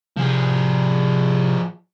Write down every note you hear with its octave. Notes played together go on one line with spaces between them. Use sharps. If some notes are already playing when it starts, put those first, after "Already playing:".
C3 F3 G#4